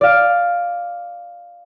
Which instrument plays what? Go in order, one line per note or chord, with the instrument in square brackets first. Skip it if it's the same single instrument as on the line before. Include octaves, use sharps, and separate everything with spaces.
[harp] D5 F5